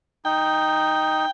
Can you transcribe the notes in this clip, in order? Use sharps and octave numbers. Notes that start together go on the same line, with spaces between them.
D#4 G5